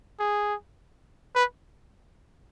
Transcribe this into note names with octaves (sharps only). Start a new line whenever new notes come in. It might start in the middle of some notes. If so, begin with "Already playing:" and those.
G#4
B4